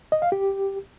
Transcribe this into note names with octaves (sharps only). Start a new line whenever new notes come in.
D#5
F5
G4